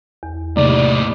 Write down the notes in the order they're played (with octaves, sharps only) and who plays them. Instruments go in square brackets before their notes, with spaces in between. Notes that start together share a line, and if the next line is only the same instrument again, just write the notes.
[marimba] E2
[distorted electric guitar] A2 D#4 [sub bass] C3 [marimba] A#3 [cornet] D5